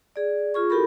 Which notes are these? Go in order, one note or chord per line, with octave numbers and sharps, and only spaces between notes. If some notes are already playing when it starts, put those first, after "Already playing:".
G#4 D5
F4 G#4 C#6
E4 F#4 G4 A4 A#4 B5